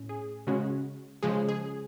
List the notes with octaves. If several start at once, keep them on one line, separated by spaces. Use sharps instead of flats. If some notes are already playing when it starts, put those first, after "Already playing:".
Already playing: A2 C#4
G#4
C#3 G#3 C#4 F#4
C#3 F3 G#3 G#4
G#4